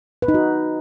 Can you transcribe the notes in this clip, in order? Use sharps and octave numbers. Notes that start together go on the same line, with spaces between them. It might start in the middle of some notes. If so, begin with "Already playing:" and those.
B4
D#4
F#4